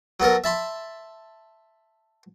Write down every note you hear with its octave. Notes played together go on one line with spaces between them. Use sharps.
F#3 B3 A4 A#4
E5 A5 B5 C6